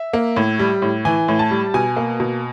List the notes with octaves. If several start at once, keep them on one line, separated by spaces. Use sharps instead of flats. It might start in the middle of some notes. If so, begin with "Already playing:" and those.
Already playing: E5
A#3
A2
G3
A2
E3 G#5
A2
A5
G3
B2 G#5
A#3
B2